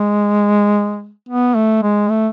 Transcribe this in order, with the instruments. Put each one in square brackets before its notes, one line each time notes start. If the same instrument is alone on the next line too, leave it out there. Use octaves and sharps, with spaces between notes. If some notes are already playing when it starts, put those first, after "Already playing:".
Already playing: [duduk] G#3
B3
A3
G#3
A3